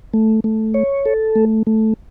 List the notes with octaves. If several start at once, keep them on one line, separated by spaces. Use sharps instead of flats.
A3
A3
C#5
A4
A3
A3